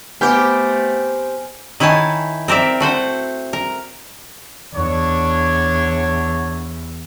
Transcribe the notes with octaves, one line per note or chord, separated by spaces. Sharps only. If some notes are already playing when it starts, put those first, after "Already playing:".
A3 B3 C4 G4 G#5 D6 F6 G6
D#3 E4 C#5 G#5 A5
C4 A#4 D5 E5
A3 F#4 C5 F#5
A#4
E2 D4 C#5